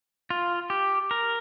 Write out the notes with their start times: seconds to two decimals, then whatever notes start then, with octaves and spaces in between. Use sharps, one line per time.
0.30 F4
0.70 G4
1.11 A#4